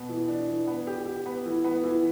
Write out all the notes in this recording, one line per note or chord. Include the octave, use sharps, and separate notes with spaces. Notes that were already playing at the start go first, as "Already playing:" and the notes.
Already playing: B2 B3
E3
D4
E3
B3
G4
G4
B3
E3
B3
E3